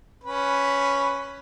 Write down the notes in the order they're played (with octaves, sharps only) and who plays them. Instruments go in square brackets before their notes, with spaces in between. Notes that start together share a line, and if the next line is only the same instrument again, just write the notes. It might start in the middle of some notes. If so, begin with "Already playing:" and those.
[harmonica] C#4 B4